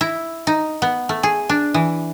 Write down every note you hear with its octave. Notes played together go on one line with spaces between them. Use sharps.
E4
D#4
B3
A3
G#4
D4
E3